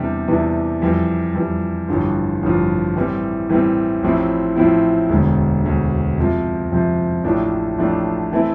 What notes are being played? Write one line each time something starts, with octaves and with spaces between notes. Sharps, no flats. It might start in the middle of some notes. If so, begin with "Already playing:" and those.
Already playing: E2 C3 E3 G3 D4
E2 C3 E3 G3 D4
F2 E3 G3
F2 E3 G3
A1 G2 D3 F3
A1 G2 D3 F3
A2 E3 G3 C4
A2 E3 G3 C4
A1 A2 F3 C4 E4
A1 A2 F3 C4 E4
E1 D2 D3
E1 D2 D3
F2 C3 F3
F2 C3 F3
A1 A2 F3 A3 D4
A1 A2 F3 A3 D4
E3 A3 C4 E4